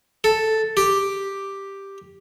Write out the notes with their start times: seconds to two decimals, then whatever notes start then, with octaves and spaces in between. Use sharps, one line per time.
0.24 A4
0.77 G4